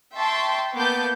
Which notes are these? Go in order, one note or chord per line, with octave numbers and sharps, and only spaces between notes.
E5 G5 A5 C6 C#6
A#3 B3 A5 D6 G6